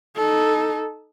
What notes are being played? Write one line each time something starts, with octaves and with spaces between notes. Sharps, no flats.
D#4 A4